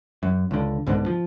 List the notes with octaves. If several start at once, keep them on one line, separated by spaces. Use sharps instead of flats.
F#2
C#2 D3
C2 G#2 B2 D3
F3